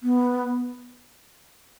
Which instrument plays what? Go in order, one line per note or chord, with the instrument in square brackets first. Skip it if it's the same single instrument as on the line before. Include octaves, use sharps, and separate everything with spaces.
[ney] B3